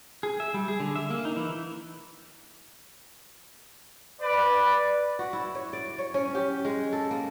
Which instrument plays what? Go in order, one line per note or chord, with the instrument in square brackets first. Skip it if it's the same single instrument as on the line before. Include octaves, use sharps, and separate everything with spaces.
[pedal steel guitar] G#4
E5
G3
G#4
D3
E5
A#3
D#4
E3
[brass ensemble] B4 D5
[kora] F#4
E4
C#5
D5
C#5
C#4
G4
G#3
A4
A#3